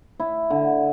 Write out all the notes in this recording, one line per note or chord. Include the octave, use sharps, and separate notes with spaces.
E4
D3